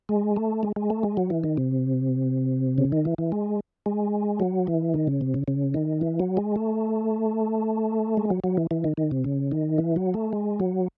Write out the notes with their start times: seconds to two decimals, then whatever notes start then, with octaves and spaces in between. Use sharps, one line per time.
0.09 G#3
0.36 A3
0.63 G#3
0.76 G#3
0.90 A3
1.03 G#3
1.17 F#3
1.30 E3
1.44 D#3
1.57 C3
2.78 C#3
2.92 D#3
3.05 E3
3.18 E3
3.32 G#3
3.86 G#3
4.40 F#3
4.67 E3
4.94 D#3
5.07 C#3
5.21 C3
5.34 C#3
5.48 C#3
5.74 D#3
6.01 E3
6.20 F#3
6.37 G#3
6.56 A3
8.17 G#3
8.30 F#3
8.44 F#3
8.57 E3
8.71 E3
8.84 D#3
8.97 D#3
9.11 C3
9.24 C#3
9.52 D#3
9.78 E3
9.96 F#3
10.14 A3
10.33 G#3
10.60 F#3